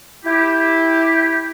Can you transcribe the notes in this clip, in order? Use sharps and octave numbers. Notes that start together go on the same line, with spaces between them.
E4 G4